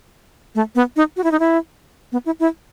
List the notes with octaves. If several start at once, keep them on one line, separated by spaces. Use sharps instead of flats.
A3
B3
D#4
F#4
E4
D#4
E4
B3
E4
E4